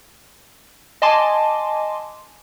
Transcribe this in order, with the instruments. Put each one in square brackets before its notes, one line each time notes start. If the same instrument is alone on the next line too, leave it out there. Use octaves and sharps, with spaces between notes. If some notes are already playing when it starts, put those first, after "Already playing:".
[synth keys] D#5 G#5 A5 C6 D6